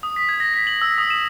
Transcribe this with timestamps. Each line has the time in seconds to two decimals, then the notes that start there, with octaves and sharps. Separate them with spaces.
0.03 D#6
0.16 B6
0.29 G#6
0.40 A#6
0.54 B6
0.67 F#7
0.82 E6
0.98 D#6
1.10 E7